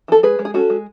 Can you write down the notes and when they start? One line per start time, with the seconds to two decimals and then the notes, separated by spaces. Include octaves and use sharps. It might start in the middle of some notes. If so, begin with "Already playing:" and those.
0.08 E3 A4
0.23 G#3 G#4 B4
0.39 G#3
0.45 G#4
0.54 C#4 F#4 A4
0.70 G#3